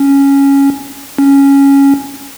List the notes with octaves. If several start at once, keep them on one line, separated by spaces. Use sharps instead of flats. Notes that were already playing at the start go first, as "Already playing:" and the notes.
Already playing: C#4
C#4